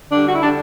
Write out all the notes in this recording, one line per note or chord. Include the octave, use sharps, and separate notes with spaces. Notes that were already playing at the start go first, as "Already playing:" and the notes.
D3 G3 D4
F#4
E4
D3 G3 D4